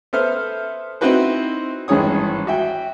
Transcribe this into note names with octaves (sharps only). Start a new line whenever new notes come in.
B3 A4 C5 E5 F6
C4 D#4 E4 F#4 B4 C5
G#1 G2 E3 G#4 C#5 D#6
F#4 E5 G5